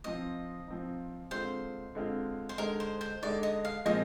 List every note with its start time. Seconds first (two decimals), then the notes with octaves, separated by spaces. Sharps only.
0.04 F3 C4 D#4 D#5
0.67 F3 C4 D#4
1.31 D3 G#3 C4 F4 C5
1.95 D3 G#3 C4 F4
2.49 C5
2.58 D3 G#3 D#4 A#4
2.80 C5
3.01 C5
3.22 D3 G#3 D#4 D5
3.43 D#5
3.65 F5
3.86 A#2 F3 G#3 C4 D#5